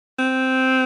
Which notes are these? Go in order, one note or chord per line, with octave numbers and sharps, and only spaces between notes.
C4